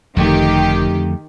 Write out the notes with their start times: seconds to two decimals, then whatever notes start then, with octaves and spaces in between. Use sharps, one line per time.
0.16 F#1 F2 D3 D#3 A3 G4